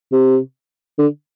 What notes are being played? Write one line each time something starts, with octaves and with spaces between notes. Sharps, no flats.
C3
D3